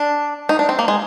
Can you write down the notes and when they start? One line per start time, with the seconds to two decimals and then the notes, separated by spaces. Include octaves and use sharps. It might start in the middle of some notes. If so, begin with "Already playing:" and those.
Already playing: D4
0.49 D#4
0.59 D4
0.69 C4
0.79 A#3
0.88 G#3